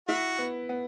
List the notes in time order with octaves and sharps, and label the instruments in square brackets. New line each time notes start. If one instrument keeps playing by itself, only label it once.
[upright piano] E4 [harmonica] F#4
[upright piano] B3
B3